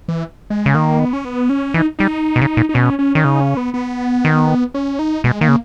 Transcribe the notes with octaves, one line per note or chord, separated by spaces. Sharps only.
E3
G#3
C#3
D#3 A#3
B3
C#4
B3
C#4
E3 D#4
G3 D#4
B2
C#3
A#2
D#4
B2 C#4
C#4
D#3 C#4
C#3 D#4
C#4
B3
B3
D#3
C#4
D#4
B2 G#3
D#3 A#3
C#3